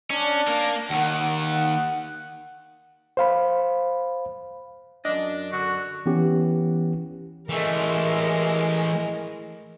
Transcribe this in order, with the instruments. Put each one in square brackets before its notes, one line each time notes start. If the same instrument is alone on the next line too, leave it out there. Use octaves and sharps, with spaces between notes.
[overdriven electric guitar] C#4 [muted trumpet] D4
[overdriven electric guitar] A#3 A#4
[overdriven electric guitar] D#2 D#3 [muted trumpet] F#5
[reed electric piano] C5 F5 B5
[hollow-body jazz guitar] F#2 D#5 [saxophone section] D4
[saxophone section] D3 [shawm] F#4
[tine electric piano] E3 B3 C#4 G4
[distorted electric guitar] E3 A3 [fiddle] G#3 A#4